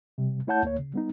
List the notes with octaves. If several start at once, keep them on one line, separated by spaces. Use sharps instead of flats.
C3 G3
A3 E4 C#5 F#5 A5 G6
D2 A#3 C#5
C#3
G3 B3 D#4